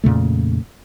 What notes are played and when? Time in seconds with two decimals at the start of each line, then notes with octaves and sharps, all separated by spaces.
0.04 F2 A#2 C#3 A3